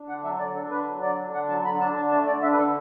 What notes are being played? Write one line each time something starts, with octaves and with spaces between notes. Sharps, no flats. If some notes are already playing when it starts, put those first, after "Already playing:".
Already playing: D4
D3 F#5
F#3 E5
D3 D5
D4 A4
D3 B4
F#3
D3 D5
D4
D3 F#5
F#3 A5
D3 B5
D4 A5
D3 A5
A3 A5
D3 D5
D4 E5
B4
D3 A4